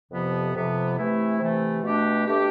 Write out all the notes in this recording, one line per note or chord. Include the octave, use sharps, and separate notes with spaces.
F2 C3 F3 B3
F2 C3 F3 B3
C3 E3 A3 E4
C3 E3 A3 E4
B2 A3 D4 G4
B2 A3 D4 G4